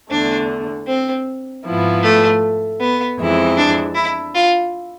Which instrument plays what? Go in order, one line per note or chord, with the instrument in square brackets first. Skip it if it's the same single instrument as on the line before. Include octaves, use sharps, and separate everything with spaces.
[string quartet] E2 D3 A3 [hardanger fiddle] D4
[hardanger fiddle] C4
[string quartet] G#2 F3 B3 E4
[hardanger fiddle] A3
B3
[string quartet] F2 E3 G#3 C4 E4
[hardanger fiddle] D4
E4
F4